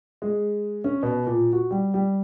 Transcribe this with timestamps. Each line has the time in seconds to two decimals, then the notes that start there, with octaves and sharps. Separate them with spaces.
0.22 G#3
0.84 C#4
1.03 B2
1.27 A#2
1.53 F#4
1.71 G3
1.94 G3